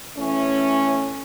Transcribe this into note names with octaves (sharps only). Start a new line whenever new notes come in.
E3 A3 C#4